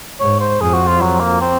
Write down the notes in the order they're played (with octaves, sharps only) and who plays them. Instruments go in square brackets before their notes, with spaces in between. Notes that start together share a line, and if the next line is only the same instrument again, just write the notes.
[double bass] G#2 [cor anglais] C#5
[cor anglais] C5
[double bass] F2 [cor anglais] G#4
[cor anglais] F#4
F4
F#3
A#3
C4